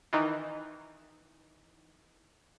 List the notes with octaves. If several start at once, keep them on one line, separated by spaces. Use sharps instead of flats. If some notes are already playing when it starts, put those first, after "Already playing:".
D#3 E3